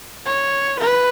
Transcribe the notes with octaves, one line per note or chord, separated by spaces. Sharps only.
C#5
B4